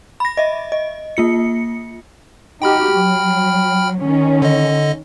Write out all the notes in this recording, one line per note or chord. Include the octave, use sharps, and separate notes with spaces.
B5 A#6
D#5 E5
D#5
A#3 F4 C#7
D#4 F#4 G4 G5 B5 F6
F#3
D#3 C#4
D3 D#5